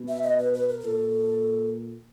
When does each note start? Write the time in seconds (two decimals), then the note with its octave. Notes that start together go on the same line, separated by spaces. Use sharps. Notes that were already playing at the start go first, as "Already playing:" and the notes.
Already playing: B2
0.08 E5
0.23 D#5
0.39 B4
0.54 B4
0.69 A#4
0.80 A#4
0.84 A#2 A4